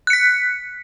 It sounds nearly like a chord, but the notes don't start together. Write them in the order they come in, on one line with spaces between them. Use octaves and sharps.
F#6 C#7 B6